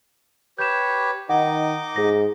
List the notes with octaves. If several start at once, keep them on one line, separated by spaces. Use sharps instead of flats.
G4 B4 C#5 G6 E7
D#3 D#4 D#5 F#5 D6
G#2 G#4 A#6